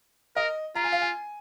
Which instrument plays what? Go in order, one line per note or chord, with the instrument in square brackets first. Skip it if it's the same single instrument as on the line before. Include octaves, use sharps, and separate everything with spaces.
[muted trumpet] A#4 [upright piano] D#5
[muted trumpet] F4 [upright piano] A#5
[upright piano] G#5
F5
G#5